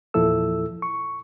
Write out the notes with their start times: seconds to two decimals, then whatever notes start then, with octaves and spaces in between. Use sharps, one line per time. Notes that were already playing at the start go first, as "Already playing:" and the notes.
0.14 E2 A#2 F3 E4 A4 E6
0.82 C#6